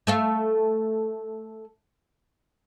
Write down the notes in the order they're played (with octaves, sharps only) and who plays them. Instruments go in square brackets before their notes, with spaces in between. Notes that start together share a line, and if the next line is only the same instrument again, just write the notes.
[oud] A3 A4 F5